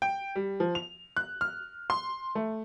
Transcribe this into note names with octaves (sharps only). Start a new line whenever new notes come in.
G5
G3
F3
F7
F#6
F6
C6
A3